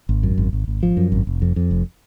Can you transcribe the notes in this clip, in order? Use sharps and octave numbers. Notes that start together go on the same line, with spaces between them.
G#1
F#2
G#1
G#1
G#1
F3
F#2
G#1
F1
F2
F2
F1